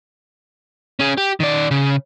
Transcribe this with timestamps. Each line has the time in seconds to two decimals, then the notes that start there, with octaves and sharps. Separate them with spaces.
1.00 C#4 G#4
1.18 G4
1.40 D#3 D5
1.71 C#3